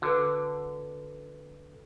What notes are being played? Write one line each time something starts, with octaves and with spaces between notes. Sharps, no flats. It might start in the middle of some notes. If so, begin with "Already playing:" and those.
D3 F#4 A4 B4